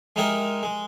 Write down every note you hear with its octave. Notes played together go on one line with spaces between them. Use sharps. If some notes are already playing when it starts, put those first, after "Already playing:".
G#3 D#4 E4 G4 G#4 A#4
G#3